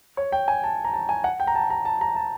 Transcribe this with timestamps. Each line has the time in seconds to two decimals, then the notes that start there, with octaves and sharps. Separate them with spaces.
0.17 C#5
0.32 G5
0.48 G#5
0.64 A5
0.85 A#5
0.93 A5
1.09 G#5
1.24 F#5
1.40 G5
1.47 A#5
1.55 A5
1.70 A#5
1.85 A5
2.01 A#5
2.16 A5